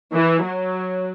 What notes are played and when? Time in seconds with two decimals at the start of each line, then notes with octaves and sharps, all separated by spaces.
0.13 E3
0.44 F#3